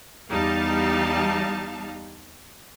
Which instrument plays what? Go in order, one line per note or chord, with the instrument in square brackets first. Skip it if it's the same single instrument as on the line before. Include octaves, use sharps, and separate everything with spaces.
[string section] E2 G3 D#4 F5 A5